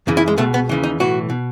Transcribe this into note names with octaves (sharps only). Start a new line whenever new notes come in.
F#2 C#3 E3
E4
G#3
C#2 B2 A3
B3
D#2 C#3 E3
D#4
B1 A2 E3 F#4
B2